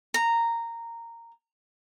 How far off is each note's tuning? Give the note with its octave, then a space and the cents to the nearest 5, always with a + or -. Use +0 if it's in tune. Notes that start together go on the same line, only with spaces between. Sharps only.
A#5 -10